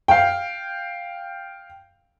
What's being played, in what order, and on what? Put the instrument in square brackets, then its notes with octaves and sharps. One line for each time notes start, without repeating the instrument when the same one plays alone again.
[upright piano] F5 G5